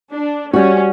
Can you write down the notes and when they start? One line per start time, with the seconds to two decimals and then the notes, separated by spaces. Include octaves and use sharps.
0.13 D4
0.53 G3 C#4 F#4